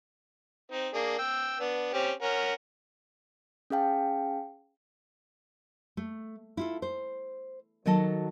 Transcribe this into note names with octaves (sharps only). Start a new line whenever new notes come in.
C4 D#4
A#3 D4 G#4
G5 E6
B3 D4
C4 C#4 G4
C#4 A#4 F#5
C#4 G#4 F5 G5 A5
A3
E4 F4 A4
C5
D#3 F#3 F#4 A4 D#5 A5